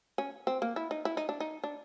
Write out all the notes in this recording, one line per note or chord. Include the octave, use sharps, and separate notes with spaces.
C#4
C4
A#3
E4
D#4
E4
D#4
D4
D#4
D4